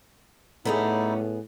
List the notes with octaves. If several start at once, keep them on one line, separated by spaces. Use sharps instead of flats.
A2 G3 A3 B3 C#4 D#4 E4 G#4